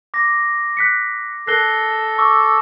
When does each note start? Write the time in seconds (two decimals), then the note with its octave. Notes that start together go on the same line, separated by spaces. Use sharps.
0.14 D6 A#6
0.77 F#6 B6 C#7
1.47 A4 A#4 F#6 A#6 C7 G7
2.18 C#6 D6 E6